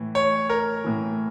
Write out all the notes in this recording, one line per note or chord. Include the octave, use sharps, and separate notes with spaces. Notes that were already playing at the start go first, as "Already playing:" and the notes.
Already playing: A2 E3
C#5
A#4
A2 E3